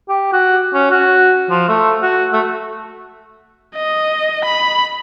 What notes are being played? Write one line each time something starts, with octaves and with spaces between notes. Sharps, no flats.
G4
F#4
C#4
F#4
F3
A3
F#4
A3
D#5
B5